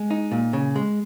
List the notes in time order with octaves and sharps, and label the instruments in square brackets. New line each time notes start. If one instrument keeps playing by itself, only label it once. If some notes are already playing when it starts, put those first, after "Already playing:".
Already playing: [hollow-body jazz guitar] G#3
D#4
A#2
C#3
G#3